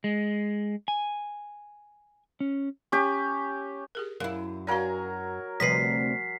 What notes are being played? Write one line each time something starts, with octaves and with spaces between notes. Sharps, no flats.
G#3
G#5
C#4
C#4 G4
G4 G#4 A#4
F#2 E4 A#4 F5
F#3 A#4 D5 F5 G#5 A#5
D2 C3 F3 G3 B4 B6 C7